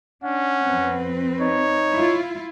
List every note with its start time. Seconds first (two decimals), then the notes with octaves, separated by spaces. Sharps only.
0.24 C#4 D4 F#5
0.66 F2 C4 B4
1.40 D#4 C#5
1.95 E4 F4